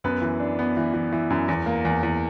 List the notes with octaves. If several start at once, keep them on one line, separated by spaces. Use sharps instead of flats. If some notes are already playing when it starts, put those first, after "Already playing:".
F#2 B3 B4
E3
D4
B3
E3
E3
E3
F#2
E2
A#3
E2
E2